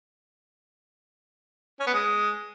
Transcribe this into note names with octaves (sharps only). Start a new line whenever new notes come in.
C#4
B3
G#3